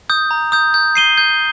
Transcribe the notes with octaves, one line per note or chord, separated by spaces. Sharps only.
D#6 G6
A#5
D#6 G6
G6
C7 D#7 G7
G6